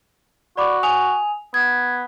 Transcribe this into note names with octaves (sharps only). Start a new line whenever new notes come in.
F#4 D5 B5 D6
G#5 D#6 F7
B3 G#6